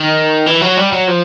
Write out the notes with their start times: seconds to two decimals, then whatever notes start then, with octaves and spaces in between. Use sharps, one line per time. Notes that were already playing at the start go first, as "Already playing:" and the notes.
Already playing: D#3
0.47 E3
0.62 F#3
0.77 G3
0.93 F#3
1.08 F3